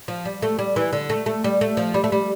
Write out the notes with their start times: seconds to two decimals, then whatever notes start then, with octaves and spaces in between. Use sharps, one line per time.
0.08 F3
0.25 G3
0.42 A3
0.59 G3
0.76 E3
0.93 D3
1.10 A3
1.26 A3
1.44 G3
1.61 A3
1.77 F3
1.94 G3
2.04 A3
2.12 G3